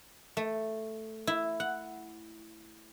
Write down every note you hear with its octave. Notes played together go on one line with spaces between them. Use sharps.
A3
E4
F#5